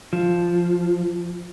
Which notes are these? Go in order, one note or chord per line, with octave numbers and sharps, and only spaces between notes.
F3